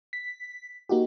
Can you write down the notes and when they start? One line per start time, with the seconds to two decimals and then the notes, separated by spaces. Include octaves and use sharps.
0.13 B6
0.89 A#3 D#4 F#4 G4